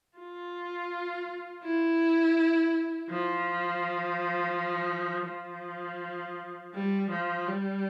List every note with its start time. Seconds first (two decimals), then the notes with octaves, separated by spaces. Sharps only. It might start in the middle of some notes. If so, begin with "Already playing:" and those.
0.18 F4
1.64 E4
3.10 F3
5.28 F3
6.75 G3
7.11 F3
7.48 G3